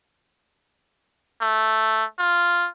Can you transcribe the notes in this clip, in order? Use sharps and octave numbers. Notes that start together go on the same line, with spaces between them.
A3
F4